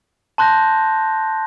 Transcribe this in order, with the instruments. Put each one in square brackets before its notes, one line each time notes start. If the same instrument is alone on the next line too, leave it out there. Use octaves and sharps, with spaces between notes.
[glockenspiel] A5 C6 F#6 G6 A#6